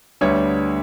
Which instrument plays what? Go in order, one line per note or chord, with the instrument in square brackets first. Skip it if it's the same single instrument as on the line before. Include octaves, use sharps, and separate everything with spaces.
[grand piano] D2 D3 G3 B3 C#5